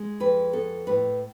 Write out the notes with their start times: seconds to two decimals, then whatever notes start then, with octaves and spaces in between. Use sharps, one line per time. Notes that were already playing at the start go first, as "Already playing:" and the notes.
Already playing: G#3
0.20 F2 B4
0.53 B3 A4
0.87 A2 B4